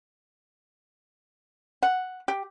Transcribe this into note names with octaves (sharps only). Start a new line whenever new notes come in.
F#5
G4